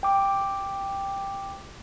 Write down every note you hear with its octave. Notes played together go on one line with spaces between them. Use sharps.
G5 D6